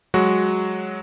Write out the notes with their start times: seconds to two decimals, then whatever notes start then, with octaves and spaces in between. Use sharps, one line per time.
0.14 F#3 G#3 F#4